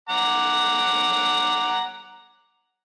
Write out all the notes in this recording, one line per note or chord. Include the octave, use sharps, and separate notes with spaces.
F#5 A#5 D6